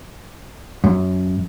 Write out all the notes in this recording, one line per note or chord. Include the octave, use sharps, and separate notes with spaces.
F#2